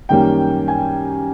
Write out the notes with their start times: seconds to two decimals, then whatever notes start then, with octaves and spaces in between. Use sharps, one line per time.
0.09 F#2 D#3 G3 A#3 C#4 G5
0.68 G#5